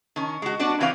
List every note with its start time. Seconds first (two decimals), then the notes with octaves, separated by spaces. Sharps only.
0.16 D#3 C#4
0.42 G#3 F#4
0.59 B3 D4 F#4 D5
0.80 E3 C4 B4 C#5 F5